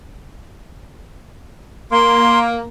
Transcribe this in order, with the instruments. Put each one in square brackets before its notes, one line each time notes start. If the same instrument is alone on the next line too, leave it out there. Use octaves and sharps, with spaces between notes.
[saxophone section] A#3 [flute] C6